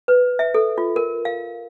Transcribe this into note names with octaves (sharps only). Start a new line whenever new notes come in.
B4
E5
A4
F4
A#4
F5